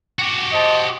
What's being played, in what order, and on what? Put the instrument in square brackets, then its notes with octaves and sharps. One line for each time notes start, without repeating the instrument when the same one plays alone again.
[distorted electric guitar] F#4 G4
[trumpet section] C5 D#5 A5